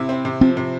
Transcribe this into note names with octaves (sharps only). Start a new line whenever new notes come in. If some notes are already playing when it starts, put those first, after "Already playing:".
Already playing: C3 E4
C4
C3
F3 C4
C3